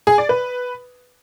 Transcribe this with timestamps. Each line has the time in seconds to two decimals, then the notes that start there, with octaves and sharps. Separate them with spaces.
0.07 G#4
0.18 D5
0.29 B4